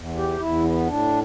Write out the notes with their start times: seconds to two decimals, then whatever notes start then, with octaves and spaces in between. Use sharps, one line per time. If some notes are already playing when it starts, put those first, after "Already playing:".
Already playing: E2
0.17 G4
0.40 E2 E4
0.64 B3
0.87 A2 D4